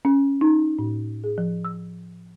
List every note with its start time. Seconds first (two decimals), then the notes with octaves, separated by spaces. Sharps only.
0.05 C#4
0.41 D#4
0.79 A2
1.24 G#4
1.38 F3
1.65 E6